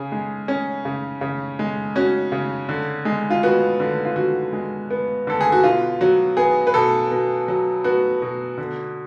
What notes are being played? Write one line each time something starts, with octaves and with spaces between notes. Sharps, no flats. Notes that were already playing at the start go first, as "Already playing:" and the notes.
Already playing: C#3 G#4
G#3
C#4
C#3
C#3
G#3
C#4 F#4
C#3
D3
G#3
F4
B3 F#4
D3
F4
D3 F#4
G#3
B3
D3 A4
G#4
F#4
B2 F4
F#3 F#4
B3 G#4
B4
B2 A4
B2
F#3
B3 F#4
B2
D3